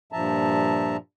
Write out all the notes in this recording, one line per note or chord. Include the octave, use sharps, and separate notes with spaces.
G2 A#2 F3 E5 A5 A#5